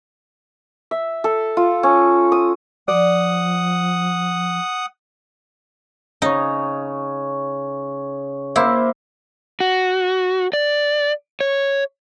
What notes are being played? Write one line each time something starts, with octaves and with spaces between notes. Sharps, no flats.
E5
A4
F4
C#4
D#6
F3 D5 F#5 D#6
C#3 D#4 C#5
A#3 E4 C5 E5
F#4
D5
C#5